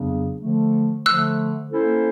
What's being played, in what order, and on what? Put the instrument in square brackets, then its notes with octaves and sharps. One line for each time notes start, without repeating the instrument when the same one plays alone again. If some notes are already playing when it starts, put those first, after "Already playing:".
Already playing: [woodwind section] F2 C#3 F#3 B3 D4
D3 F3 A3
[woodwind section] D3 F3 A3 [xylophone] E6 F#6
[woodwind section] A#3 C#4 E4 A4 C5